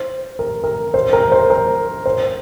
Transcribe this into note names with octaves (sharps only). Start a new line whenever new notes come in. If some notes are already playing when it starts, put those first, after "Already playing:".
Already playing: C5
A#4
A#4
C5
A#4
C5
A#4
C5